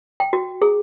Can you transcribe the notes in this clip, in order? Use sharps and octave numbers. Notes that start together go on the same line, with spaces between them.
G5
F#4
G#4